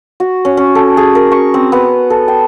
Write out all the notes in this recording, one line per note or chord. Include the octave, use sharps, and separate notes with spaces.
F#4
C#4
C#4
A4
G#4
A#4
C#6
C4
B3
A4
G5